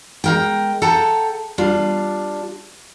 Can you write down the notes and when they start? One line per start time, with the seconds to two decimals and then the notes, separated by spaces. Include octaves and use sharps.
0.24 G#3 A#4 G5
0.82 A4 F#5 G5 A5 A#5
1.58 G3 D4 F4